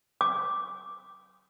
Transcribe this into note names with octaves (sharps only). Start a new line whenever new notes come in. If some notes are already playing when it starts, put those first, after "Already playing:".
D6